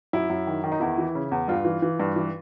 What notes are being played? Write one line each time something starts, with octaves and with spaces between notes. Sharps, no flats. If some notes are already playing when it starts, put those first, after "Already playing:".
F#2 E4
F#2
D#3
D#3
D#4
E2 E4
E3
C#3
E2
G2 F4
E3
E3
G2
E3